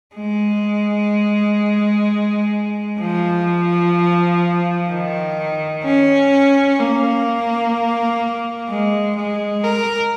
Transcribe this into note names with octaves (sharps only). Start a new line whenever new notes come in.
G#3
F3
D#3
C#4
A#3
G#3
G#3
A#4